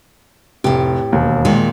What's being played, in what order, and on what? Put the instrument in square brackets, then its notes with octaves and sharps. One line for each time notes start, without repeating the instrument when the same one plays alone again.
[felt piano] F1 [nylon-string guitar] A2 G4
[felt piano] E1 D#2
[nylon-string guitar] A#2 D#3 G#3